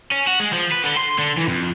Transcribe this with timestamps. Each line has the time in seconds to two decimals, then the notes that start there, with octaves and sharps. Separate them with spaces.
0.11 C#4
0.27 F#4
0.40 G#3
0.53 F3
0.71 B4
0.83 D3
0.97 C6
1.19 D3
1.37 E3
1.49 F2